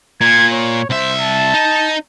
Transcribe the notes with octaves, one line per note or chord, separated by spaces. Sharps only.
A#2 G#6
C#5
C2 C5 E5
A5
D#4